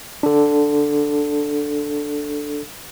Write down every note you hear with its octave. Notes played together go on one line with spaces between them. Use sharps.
D4 A4